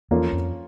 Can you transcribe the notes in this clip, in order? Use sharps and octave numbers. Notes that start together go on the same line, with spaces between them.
E2 F3 A#3 C#4 F4 A4
F2